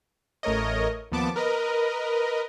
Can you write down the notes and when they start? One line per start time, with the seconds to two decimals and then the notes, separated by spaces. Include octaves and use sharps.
0.43 A1 A3 A#4 C#5 D#5
1.12 D#2 F3 B3 A5 D6
1.36 A#4 B4 D#5